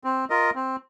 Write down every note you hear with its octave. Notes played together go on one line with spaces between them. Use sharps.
C4
F4 A#4 D#5
C4